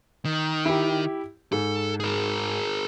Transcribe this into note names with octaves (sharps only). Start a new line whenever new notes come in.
D#3
E4 G4
G#2 A4
G#4 A#4